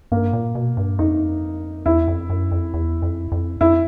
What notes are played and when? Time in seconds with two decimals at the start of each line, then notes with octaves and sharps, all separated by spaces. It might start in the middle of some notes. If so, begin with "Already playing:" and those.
0.12 G2 A#3
0.33 A#2
0.55 B2
0.77 G2
0.99 F2 D#4
1.86 E2 E4
2.08 F2
2.30 F#2
2.51 F2
2.74 E2
3.02 F2
3.32 F2
3.61 F2 E4